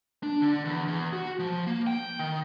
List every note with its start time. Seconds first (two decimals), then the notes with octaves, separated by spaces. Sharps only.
0.23 D4
0.42 D3
0.65 E2
0.88 E2
1.13 F#4
1.39 F3
1.67 A#3
1.87 G5
2.19 D#3